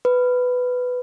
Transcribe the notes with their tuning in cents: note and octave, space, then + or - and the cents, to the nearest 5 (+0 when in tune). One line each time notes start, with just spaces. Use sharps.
B4 +10